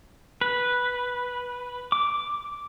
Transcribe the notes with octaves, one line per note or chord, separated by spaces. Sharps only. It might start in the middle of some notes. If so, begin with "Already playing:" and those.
B4
D6